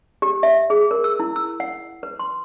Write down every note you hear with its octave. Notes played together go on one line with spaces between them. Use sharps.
G4
E5
G#4
A#4
E6
E4
E6
F#5
B4
C6